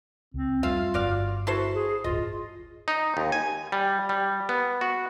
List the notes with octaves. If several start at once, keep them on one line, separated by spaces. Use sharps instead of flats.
C#2 C4
F2 G3 A3 F4 E5 F5
G1 F#4 D5 F5
E4 F#4 A4 C5
G#4
D1 G1 F4 D#5
D#4
D#2
G#5
G3
G3
B3
F#4